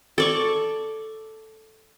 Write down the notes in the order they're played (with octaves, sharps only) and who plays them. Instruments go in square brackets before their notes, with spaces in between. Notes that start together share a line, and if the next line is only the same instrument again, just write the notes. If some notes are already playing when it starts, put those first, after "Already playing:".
[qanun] A4 D5 C#6